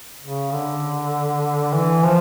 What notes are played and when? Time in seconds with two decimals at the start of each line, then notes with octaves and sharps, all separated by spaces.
0.23 C#3
0.52 D3
1.73 E3
2.03 F3